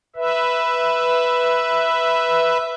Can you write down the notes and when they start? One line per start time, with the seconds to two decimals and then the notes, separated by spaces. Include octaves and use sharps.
0.16 B4 E5